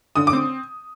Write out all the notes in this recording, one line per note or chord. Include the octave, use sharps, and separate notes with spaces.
D3 D#6
D6
C4